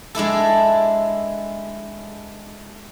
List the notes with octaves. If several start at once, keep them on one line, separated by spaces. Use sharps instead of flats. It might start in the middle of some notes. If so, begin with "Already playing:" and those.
G#3 D4 E4 A4